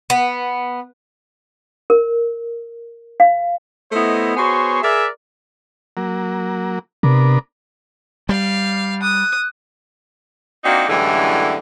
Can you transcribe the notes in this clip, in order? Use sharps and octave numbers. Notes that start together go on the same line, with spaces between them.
B3
A#4
F5
A3 B3 E4 C5 D#5
B3 F#4 G#4 C5 C#5 C6
G#4 A#4 D5 E5
F#3 A#3
C3 B3 D4 A#4
G3 F5
D#6 F#6
A#3 C4 D4 D#4 F4 F#4
F#2 A2 D3 E3 G3 G#3